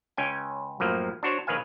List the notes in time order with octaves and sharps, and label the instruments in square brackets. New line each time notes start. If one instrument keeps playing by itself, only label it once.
[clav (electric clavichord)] C#2 C#4 G5 G#5
F#2 A2 F3 A#3
D4 F#4 C5 C#5
A#1 D#3 B4 F5 G#5